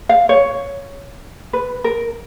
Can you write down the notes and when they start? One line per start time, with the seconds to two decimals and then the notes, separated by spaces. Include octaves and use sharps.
0.09 F5
0.29 C#5
1.53 B4
1.84 A#4